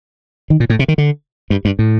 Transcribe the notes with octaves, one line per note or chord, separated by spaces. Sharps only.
D#3
A#2
A2
C3
D#3
D3
G2
G2
A2